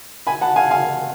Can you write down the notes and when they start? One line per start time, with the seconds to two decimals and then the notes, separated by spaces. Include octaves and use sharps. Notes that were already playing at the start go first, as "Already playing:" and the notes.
0.27 G#5 B5
0.41 F#5 A5
0.56 F5 G#5
0.71 F5 G#5